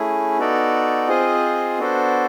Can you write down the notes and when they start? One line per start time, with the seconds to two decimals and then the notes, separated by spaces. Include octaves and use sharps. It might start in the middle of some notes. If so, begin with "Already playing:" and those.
Already playing: A3 C#4 E4 G#4
0.38 B3 D#4 F#4 A4 D5
1.08 C4 F4 G#4 C5 D#5
1.79 B3 D4 F#4 A4 C5